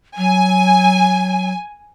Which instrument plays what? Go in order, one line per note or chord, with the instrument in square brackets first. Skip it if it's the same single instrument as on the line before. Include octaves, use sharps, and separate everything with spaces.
[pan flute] F#3 [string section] G#5